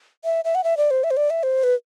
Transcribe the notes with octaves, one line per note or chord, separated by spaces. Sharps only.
E5
E5
F#5
E5
D5
C5
E5
C5
D5
E5
C5
B4